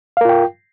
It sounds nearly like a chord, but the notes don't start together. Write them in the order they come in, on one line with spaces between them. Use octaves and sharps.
F5 A#4 F4 G5